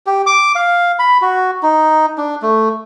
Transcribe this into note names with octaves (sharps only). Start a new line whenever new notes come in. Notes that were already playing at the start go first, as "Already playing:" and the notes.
G4
D6
F5
B5
F#4
D#4
D4
A3